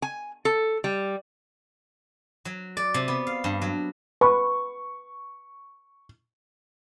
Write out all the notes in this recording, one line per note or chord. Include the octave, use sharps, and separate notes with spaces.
G#5
A4
G3
F#3
D5
C3
B3
F5
G2
F#3
B4 C#6